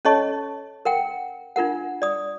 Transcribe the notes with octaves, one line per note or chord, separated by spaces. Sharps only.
C#4 A4 C#5 D#5 A5 C#6
A#4 F#5 G5
D4 F4 A#4 F#5
D5 D#6